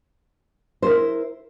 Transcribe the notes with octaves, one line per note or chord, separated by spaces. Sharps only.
E4 A#4 C5